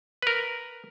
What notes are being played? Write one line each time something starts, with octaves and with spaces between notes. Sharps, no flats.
A#4 B4